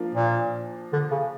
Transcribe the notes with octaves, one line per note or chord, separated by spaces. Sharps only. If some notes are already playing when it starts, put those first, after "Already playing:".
Already playing: F3 A#3 D4
A#2
D3
C#3